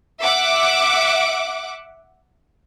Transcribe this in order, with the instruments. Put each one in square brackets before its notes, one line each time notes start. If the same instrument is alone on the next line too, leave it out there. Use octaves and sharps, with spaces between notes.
[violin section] E5 F#5 D6